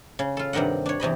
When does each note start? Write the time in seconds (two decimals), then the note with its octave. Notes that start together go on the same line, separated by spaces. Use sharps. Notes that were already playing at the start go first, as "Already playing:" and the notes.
0.19 C#3
0.37 F4 A4
0.53 G2 C3 D#3 D#5 F#5
0.86 D4 C#5
1.00 E2 C3 D#5 B5